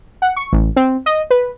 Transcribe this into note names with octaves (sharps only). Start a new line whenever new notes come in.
F#5
C#6
A1
C4
D#5
B4